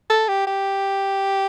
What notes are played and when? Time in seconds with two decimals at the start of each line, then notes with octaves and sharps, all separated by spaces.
0.10 A4
0.28 G4
0.47 G4